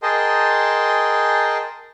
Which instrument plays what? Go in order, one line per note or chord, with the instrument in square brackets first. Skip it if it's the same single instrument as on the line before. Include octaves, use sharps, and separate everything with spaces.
[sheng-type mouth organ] G#4 A#4 D#5 G5 A5 C6